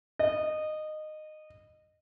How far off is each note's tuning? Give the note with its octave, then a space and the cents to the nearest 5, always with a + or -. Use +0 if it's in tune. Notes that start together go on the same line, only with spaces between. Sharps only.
D#5 -15